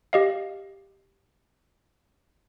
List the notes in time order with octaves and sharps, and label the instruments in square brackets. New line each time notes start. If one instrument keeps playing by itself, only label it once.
[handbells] G4 D#5 F5